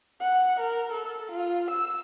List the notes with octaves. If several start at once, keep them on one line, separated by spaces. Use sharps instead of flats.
F#5
A#4
A4
F4
E6